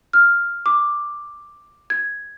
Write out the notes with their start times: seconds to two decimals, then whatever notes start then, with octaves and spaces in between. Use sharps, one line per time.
0.13 F6
0.66 D6
1.90 G#6